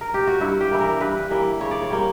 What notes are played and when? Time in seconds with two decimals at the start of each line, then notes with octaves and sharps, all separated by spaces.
0.01 A#4
0.14 G4
0.27 F#4
0.40 G2 E4
0.61 G4
0.71 E3 G3 A#3
0.81 A#4
1.00 G2 B4
1.30 E3 G3 A#3
1.60 C#3 C#5
1.71 D5
1.82 C#5
1.90 G3 A#3